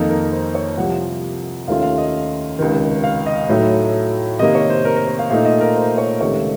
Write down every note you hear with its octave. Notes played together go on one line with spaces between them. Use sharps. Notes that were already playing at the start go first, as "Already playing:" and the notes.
Already playing: F2 D#3 A#3 D#4 A4
A#4
C5
C#5
C2 C3 F3 F#5
D#2 D#3 A3 C#4 F4 F5
F5
D#5
C#2 C3 D#3
F5
D#5
A2 F#3 A3 D#4
C3 D#3 A#3 D#5
C#5
C5
A#4
A#4
C5
F5
A#2 A3 D#4 F5
D#5
A#4
C5
C#5
C#2 C3 D#3 A3 C#5